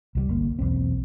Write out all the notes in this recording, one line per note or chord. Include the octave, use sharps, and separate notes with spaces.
C2 F3 G3
G1 A#3
B1 E2 C4